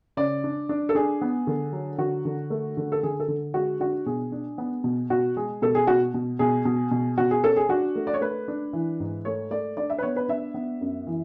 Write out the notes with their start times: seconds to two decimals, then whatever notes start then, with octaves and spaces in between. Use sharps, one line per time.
0.17 C#3 D5
0.44 D4
0.69 D4
0.89 A4
0.95 D4 G#4
1.21 B3
1.47 D3
1.72 F#3
1.98 D3 F#4
2.25 D3
2.50 A3
2.77 D3
2.92 A4
3.03 D3 G#4
3.20 A4
3.28 D3
3.54 G#3 F#4
3.80 D4 F#4
4.06 B2 G#4
4.32 D4
4.58 B3
4.84 B2
5.10 B2 F#4
5.37 G#3 G#4
5.62 B2 A4
5.75 G#4
5.87 B2 F#4
6.14 B2
6.39 B2 G#4
6.65 B2
6.91 B2
7.18 B2 F#4
7.31 G#4
7.43 C#4 A4
7.57 G#4
7.69 D4 F#4
7.95 A3
8.07 D5
8.14 C#5
8.21 A3 B4
8.48 D4
8.73 E3
9.00 G#2
9.25 A3 C#5
9.51 A3 D5
9.77 D4 D5
9.90 E5
9.98 B4
10.02 B3 C#5
10.16 B4
10.29 D4 E5
10.54 B3
10.81 F#2
11.07 E3